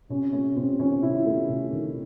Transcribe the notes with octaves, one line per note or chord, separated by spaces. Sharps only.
C3 C#4
A3 C#4
C3 C4
D#3 C#4
C3 E4
A3
C3
D#3